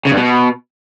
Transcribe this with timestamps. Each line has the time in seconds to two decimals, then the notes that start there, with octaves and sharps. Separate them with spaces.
0.05 C#3
0.11 G2
0.17 B2